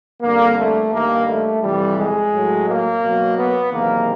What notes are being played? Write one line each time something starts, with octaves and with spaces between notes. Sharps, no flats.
F2 D3 G3 A#3
A3
G2 D#3 G3 A#3
A3
F2 C3 E3 G3
G#3
A2 F#3
A#3
B2 F#3
B3
E2 C3 D#3 F#3 A#3